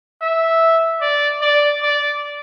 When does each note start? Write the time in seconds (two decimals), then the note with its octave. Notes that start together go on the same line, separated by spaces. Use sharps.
0.21 E5
1.01 D5
1.41 D5
1.82 D5